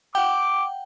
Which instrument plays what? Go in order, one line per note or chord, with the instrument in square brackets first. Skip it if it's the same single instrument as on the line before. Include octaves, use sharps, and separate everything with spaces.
[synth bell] F#5 G5 [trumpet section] D6